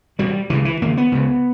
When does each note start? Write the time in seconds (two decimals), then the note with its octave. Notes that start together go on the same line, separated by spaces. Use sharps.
0.19 E2 B2 G3
0.49 C#2 C#3 E3
0.65 E3
0.82 D#2 C#3 A#3
0.97 B3
1.12 C#2 C#3